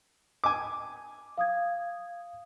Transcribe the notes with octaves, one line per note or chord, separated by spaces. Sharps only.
G#5 D6
F5 D#6 G#6